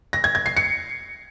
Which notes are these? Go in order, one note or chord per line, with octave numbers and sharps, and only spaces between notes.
A#6
G#6
G#6
C7
C#7